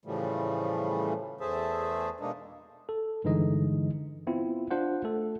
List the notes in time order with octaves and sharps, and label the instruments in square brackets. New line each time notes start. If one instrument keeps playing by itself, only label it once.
[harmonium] A2 C#3 E3 F3 G3 A3
E2 A3 G#4 C5 E5 A5
B2 G#3 A#3 D4 D#4
[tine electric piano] A4
G2 D3 E3 G#3 D#4 D#5
B3 C4 E4 F4
D4 F4 C5 F#5
A3 A4